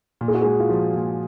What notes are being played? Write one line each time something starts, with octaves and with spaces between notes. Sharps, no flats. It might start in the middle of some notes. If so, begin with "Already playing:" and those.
A#2
G#4
F#4
G#4
G#3
F4
F3 F#4
A#2